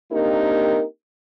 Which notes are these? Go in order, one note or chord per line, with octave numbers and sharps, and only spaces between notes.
A#3 C4 D4 D#4 G4 A#4